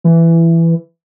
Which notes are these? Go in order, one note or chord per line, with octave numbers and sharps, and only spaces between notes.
E3